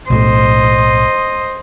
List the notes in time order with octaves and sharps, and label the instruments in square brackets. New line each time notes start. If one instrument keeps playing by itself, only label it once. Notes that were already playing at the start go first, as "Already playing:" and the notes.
[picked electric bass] B1 A2 [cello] C5 D#5